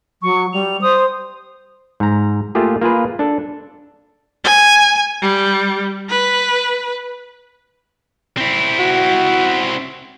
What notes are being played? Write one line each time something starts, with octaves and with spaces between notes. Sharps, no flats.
F#3 C#6
G3 F7
C5 D#6
G#2 A#5
A3 A#3 F4 G4 G#4
A#3 F4 G#4 B4
D4 A4
G#5
G3
B4
C4 E4
F#4